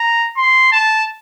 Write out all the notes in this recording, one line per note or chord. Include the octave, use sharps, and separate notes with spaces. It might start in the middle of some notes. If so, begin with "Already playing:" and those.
Already playing: A#5
C6
A5